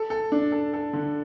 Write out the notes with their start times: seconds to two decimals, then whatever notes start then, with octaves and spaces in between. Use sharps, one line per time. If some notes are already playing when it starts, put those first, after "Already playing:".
Already playing: A4
0.10 A4
0.32 D4
0.52 A4
0.73 A4
0.93 D3